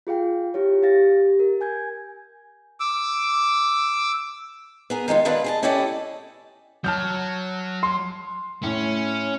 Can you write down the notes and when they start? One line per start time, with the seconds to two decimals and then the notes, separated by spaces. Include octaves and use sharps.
0.07 F4 G#4 F5 G5
0.54 E4 G4 C#5
0.83 G4 F5 A6 A#6
1.09 G4
1.40 A#4
1.61 G#5 G6 G#6
2.80 D6 E6
4.90 B3 G#4 A#4
5.08 D#3 G#3 D#4 F4
5.25 D#3 B3 D4 E4 F4 B4
5.44 G#4 D#5 A5
5.63 C#4 E4 G4 A4 D5 D#5
6.84 F#3 A5 F6 G6
7.83 C6
8.63 A2 C#4